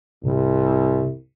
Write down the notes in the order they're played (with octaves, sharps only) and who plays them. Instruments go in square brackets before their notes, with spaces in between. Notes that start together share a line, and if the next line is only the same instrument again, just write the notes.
[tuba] C2 [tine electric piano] G#2 C3